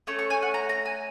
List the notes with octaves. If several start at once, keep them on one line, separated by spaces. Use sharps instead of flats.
A3 C#4 C#6
C#6
G#5
F#5
A#5
A#5
G#5